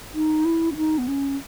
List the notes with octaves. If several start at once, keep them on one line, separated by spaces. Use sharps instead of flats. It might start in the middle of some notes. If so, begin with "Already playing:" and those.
D#4
E4
C#4
D#4
B3
C#4